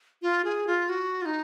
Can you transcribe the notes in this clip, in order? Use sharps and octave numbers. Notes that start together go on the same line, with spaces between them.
F4
G#4
F4
F#4
F4
D#4